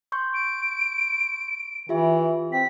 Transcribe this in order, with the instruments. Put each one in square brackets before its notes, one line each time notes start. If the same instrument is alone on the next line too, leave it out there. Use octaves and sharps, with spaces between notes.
[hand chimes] C6 C#6 G6
[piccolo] D7
[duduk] E3 [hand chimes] F4 G4 E5
[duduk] C4 [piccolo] B6